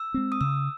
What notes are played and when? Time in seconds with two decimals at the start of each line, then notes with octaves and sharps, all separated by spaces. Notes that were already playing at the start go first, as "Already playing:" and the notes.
Already playing: E6
0.14 G#3 C4
0.32 D#6
0.41 C#3 E6